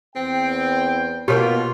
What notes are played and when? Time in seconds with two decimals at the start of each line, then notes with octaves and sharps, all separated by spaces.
0.16 E2 C4 G5
1.28 B2 A#3 B3 F4 G4 C#5